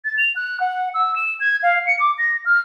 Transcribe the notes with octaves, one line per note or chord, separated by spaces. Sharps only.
A6
F7
F#6
F#5
E6
E7
G#6
F5
C#7
D6
A#6
F6